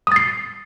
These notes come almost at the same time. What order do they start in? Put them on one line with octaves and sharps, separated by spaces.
D#6 A6 C7